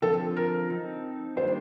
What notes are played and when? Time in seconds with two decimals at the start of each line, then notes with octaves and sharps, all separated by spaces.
0.02 D3 F3 C4 F4 A4
0.37 A#4
0.70 C4 D#4 A4
1.37 D#3 G3 A#3 D4 C5